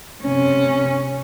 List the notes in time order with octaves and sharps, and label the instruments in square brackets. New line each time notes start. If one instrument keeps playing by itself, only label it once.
[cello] C3 C#4